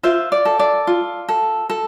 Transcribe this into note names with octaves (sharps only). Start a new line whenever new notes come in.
F4 C5 E5
D5
A4
D5
F4
A4
A4